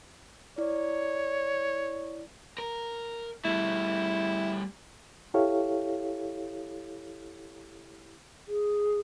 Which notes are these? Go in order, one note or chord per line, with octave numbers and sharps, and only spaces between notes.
E4 C#5 D5
A#4
G3 A3 E4
E4 G4 A4 C#5 F5
G#4